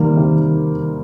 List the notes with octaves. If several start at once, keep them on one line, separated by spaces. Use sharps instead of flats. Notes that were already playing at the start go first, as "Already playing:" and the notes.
Already playing: C3 D#3 G3 A#3
C3